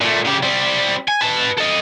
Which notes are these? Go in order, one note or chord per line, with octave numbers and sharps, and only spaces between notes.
A#2 A3
C#3 G4
G3 C4
G#5
B4 A5
A4 D#5